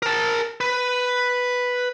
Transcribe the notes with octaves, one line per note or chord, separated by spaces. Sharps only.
A#4 A5
B4